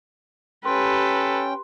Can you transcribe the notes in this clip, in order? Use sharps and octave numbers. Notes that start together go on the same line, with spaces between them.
C#4 G4 A4 B4 G5 C6